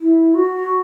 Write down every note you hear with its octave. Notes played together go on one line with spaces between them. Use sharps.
E4
F#4